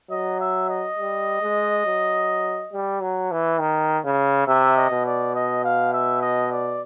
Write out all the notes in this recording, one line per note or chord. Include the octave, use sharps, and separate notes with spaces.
F#3 D#5
E5
D#5
G3
G#3
F#3
G3
F#3
E3
D#3
C#3
C3 E5
D#5
B2
D5
D#5
F5
E5
D#5
D5